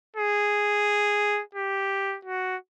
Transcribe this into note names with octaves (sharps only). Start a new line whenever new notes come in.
G#4
G4
F#4